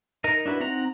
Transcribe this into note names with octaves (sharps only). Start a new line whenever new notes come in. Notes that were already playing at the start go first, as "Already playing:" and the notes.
D#4 A#4 D#5
D4 E4 F#4 B4
C4 D#4 F#5 A#5